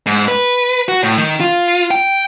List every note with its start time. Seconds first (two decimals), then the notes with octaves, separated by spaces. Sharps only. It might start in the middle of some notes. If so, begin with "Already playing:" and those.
0.06 G#2
0.28 B4
0.88 F#4
1.03 A2
1.18 D#3
1.40 F4
1.91 G5